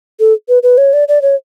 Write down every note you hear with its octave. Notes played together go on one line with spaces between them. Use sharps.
A4
B4
B4
C#5
D5
D5
C#5